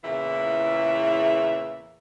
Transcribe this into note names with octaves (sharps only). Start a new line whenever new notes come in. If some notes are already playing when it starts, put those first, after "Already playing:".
E2 A#2 C#3 E3 E4 E5